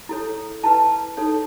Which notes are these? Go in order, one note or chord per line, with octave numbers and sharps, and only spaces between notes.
E4 A4 C#5
E4 B4 A5
D#4 A4 C#5